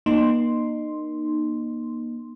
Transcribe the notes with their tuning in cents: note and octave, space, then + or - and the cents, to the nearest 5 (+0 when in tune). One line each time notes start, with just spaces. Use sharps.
A#3 +30 D#4 -25 C6 +0